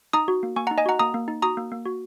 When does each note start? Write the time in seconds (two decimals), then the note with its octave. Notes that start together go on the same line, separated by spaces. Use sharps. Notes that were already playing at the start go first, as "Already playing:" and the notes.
0.13 D#4 A#5 D#6
0.28 F#4
0.43 A#3
0.56 A#3 G#5 C#6
0.67 F#5 A#5
0.71 D#4
0.78 D#5 G#5
0.86 F#4 F#5 A#5
0.99 A#3 A#5 D#6
1.14 A#3
1.28 D#4
1.42 F#4 A#5 D#6
1.57 A#3
1.72 A#3
1.86 F#4